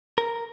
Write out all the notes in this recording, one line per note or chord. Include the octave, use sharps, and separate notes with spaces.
A#4